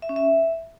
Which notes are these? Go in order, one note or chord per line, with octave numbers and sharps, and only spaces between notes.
E5
C#4
E5